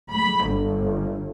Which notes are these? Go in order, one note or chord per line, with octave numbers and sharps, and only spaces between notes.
B5
G1